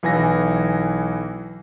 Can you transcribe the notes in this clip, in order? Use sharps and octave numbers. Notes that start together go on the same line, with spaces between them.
B1 E3 G#5 A#6